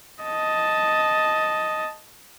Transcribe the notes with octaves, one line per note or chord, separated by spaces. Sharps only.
D#5 A5